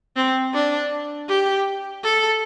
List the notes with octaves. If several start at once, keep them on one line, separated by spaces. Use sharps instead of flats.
C4
D4
G4
A4